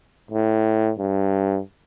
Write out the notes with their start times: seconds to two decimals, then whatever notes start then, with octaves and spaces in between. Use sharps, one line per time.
0.31 A2
0.99 G2